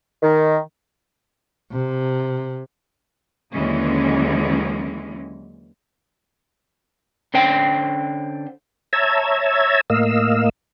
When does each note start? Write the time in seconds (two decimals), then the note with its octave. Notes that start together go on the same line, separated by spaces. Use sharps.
0.22 D#3
1.72 C3
3.53 D#2 D3 E3 F#3 G#3 C#4
7.34 D3 C#4 C5 D5 G5
8.93 C#5 E5 A5 A#5 E6 G#6
9.90 A2 A#3 D#5 F5 E6